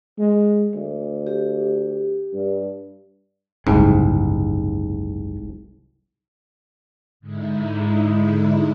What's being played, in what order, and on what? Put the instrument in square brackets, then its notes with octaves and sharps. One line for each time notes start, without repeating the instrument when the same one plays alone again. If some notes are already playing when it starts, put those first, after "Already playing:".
[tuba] G#3
D2
[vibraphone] G4
[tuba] G2
[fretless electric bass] F#1 G#3 [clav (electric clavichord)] C2 G#2
[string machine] G#2 D3 G#3 D#4 E4